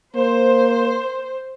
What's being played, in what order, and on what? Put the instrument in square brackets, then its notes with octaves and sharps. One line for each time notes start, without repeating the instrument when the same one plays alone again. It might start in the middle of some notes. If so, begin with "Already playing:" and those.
[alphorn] A#3 [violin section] C5